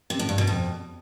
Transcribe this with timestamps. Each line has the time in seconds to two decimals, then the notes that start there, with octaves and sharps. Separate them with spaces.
0.10 C3
0.19 A2
0.29 G2
0.38 B2
0.47 F2